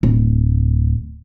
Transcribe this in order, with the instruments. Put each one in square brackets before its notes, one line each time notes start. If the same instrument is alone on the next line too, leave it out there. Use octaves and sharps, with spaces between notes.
[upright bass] D1 D2